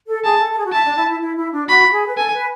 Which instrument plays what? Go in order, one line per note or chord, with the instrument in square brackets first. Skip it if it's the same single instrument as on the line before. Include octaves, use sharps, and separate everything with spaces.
[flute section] A4
[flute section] G#4 [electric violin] A5
[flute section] A4
A4
G#4
F#4
[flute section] E4 [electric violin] A5
[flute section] D4
E4
E4
E4
E4
D4
[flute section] F#4 [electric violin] B5
[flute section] F#4
G#4
B4
[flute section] A4 [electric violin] G#5
[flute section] B4